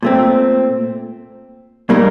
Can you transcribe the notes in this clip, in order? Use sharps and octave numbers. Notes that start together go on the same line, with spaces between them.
A#2 A3 C4
A#2 G3 A#3 D#4 A#4